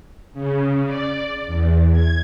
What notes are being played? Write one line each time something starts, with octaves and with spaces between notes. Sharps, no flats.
C#3
D5
E2
G#6